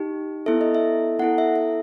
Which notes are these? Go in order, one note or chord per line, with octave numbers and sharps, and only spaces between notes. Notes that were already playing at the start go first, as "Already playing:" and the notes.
Already playing: D#4 G4
B3 E4 A4 E5
D#5
E5
B3 E4 A4 F#5
E5
E5